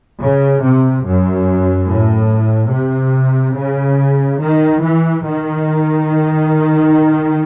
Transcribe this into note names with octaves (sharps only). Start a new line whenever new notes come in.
C#3
C3
F#2
A2
C3
C#3
D#3
E3
D#3